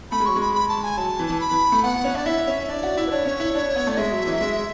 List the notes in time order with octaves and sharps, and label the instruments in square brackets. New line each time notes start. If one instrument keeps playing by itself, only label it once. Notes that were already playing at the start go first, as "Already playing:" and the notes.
[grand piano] A3 [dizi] B5
[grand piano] G#3
[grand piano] F#3 [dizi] C#6
[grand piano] G#3 [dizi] B5
[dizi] B5
A5
G#5
[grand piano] F#3 [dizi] A5
[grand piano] E3
E3
[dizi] B5
[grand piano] E3
A3
[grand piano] B3 [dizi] F#5
[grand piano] B3
C#4
[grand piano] D4 [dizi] D5
[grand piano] E4 [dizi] E5
[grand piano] C#4
[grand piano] D4 [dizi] D5
[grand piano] F#4
E4
[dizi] B4
[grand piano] D4 [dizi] C#5
[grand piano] C#4
E4
D4
D4
B3
[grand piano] A3 [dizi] D5
[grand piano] G#3 [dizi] E5
[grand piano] F#3
E3
F#3
G#3